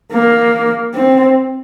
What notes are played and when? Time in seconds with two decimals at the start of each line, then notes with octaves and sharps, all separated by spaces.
0.12 A#3
0.94 C4